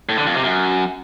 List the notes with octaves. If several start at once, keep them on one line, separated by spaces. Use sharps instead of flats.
A2
D3
F2
C3
F#2